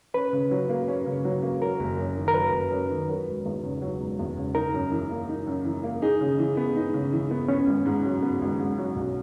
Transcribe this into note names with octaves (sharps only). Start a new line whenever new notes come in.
C#4 B4
C#3
F#3
A#3
C#4
C#3
F#3
A#3
F#3 A#4
F#1
F#2
D#3
A#4
F#3 B4
F#1
F#2
D#3
F#3
E1
E2
C#3
F#3
E1
E2
C#3
D#4 A#4
F#2
E3
A#3
D#4
F#2
E3
A#3
D#4 G#4
C#3
E3
B3
D#4
C#3
E3
B3
B3 C#4
G#1
G#2
F#3
B3
G#1
G#2
F#3
B1